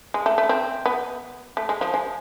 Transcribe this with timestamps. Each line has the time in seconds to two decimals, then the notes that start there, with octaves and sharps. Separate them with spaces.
0.14 G#3
0.26 A3
0.38 A3
0.49 C4
0.86 B3
1.57 A3
1.69 G#3
1.81 F3
1.94 G#3